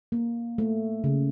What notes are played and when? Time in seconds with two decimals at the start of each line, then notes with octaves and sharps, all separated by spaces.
0.12 A#3
0.58 A3
1.04 C#3